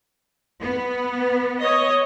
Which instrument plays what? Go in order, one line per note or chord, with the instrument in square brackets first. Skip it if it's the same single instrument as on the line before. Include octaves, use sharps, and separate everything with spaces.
[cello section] B3
[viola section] C#5 D#5